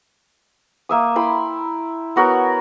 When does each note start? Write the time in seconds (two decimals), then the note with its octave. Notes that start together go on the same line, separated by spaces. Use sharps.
0.89 A#3 E5 D#6
1.15 E4 G5 B5 C6
2.16 B3 F#4 A#4 C#5